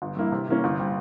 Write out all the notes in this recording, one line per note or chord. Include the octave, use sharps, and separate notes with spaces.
G1
G2 E3 A#3 E4
C3
E3 A#3 C#4
G1
G3 C4